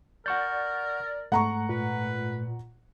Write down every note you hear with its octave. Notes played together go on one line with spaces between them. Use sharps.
A#4 D5 F#5 C#6 G6
G#2 A3 F#5 A#5 C#6
A#2 B4